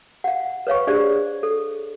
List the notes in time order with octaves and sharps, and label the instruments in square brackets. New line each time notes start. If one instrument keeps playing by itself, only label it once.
[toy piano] F5 F#5
B4 C#5 F5 C#6
D4 G4 G#4 C5 D5
A4